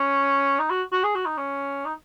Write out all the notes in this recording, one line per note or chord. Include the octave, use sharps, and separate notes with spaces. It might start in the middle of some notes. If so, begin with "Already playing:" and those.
Already playing: C#4
D#4
F#4
F#4
G#4
F#4
D#4
C#4
D#4